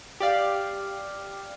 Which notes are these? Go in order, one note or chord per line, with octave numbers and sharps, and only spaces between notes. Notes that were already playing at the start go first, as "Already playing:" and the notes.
G4 D5 F5